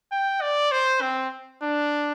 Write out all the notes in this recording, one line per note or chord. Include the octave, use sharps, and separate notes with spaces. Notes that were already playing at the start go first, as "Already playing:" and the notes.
G5
D5
C5
C4
D4